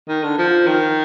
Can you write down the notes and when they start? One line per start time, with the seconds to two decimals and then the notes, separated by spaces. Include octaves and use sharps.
0.08 D#3
0.23 D3
0.38 F3
0.67 D#3